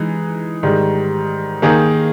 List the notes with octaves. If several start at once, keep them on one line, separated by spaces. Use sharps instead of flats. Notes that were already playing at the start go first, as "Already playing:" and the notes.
Already playing: E3 G#3 D#4
G#2 D#3 G3
D#3 A#3 D#4 G#4